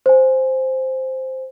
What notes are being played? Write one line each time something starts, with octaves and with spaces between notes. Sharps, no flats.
C5 G#5